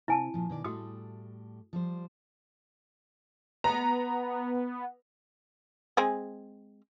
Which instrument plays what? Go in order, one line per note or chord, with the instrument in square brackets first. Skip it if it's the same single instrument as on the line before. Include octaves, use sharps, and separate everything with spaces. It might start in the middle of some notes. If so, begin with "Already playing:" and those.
[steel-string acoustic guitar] C3 [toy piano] E4 G#5 A5
[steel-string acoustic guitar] A#2 F3
B2 D#3 D5
[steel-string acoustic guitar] A2 G3 A3 [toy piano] F#4 D#6
[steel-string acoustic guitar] F3 G3 C5
[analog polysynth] B3 [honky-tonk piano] A#5
[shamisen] G#3 C4 G#4